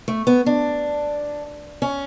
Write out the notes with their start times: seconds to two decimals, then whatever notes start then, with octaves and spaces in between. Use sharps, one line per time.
0.08 A3
0.27 B3
0.46 D4
1.82 C#4